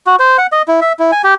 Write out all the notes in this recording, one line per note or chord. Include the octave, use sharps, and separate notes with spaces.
F#4
C5
F#5
D#5
E4
E5
E4
G#5
G4